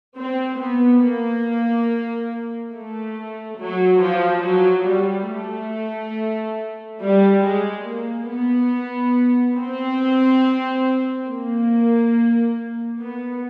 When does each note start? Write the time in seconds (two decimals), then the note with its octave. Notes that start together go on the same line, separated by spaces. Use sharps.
0.16 C4
0.59 B3
1.02 A#3
2.73 A3
3.59 F#3
4.01 F3
4.44 F#3
4.87 G3
5.30 A3
7.01 G3
7.43 G#3
7.86 A#3
8.29 B3
9.57 C4
11.28 A#3
12.99 B3